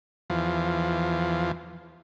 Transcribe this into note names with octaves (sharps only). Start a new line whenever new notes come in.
E2 F3